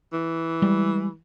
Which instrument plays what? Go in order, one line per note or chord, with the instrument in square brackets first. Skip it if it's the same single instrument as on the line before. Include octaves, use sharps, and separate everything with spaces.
[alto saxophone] E3
[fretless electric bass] G3 G#3